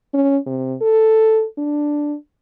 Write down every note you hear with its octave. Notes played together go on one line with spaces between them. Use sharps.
C#4
C3
A4
D4